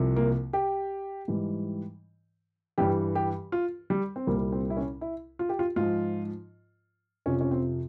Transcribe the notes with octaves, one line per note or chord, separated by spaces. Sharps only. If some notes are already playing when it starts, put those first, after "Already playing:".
Already playing: C2 C3 F3
A#3
G4
G#2 E3 G3
G2 E3 G3 G4
G4
F4
G3
C4
C2 A#2 G3 A#3
C4
E4
C#4
E4
F4
G4
F4
G#2 F3 F4
F2 C3 F3 C#4
C#4
C4